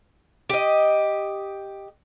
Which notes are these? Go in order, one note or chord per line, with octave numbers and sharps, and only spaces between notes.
G4 D#5